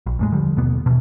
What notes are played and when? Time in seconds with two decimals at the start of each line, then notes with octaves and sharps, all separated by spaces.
0.06 A#1
0.19 E2 A2 G#3
0.32 D3 F3 G3
0.57 D#2 B2 A#3 B3
0.86 B2 E3